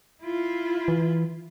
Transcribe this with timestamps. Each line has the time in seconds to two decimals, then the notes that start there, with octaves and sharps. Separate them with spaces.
0.23 E4 F4
0.88 E3